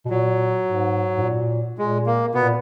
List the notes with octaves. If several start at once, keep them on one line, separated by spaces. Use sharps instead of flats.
B2
A#2 F#3
G#2
G#2
A#2
A#2 G#3
A#3
B2 B3
A#2